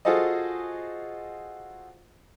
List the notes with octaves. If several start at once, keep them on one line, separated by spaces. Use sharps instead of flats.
F4 F#4 G#4 A4 C5 D#5